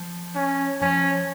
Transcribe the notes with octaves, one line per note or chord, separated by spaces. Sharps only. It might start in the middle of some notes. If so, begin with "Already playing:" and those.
Already playing: F3
C#4
F3 C#4